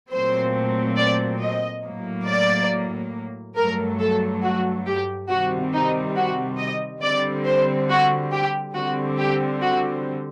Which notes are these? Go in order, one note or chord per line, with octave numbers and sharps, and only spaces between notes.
A#2 F#3 A3 C4 C5
D5
D#5
A2 F#3 A#3
D5
G2 F#3 A3 A#4
A4
F#4
G4
C3 D#3 G3 C4 F#4
D#4
F#4
D#5
D3 G3 C4 D5
C5
F#4
G4
D3 G3 C4 F#4
G4
F#4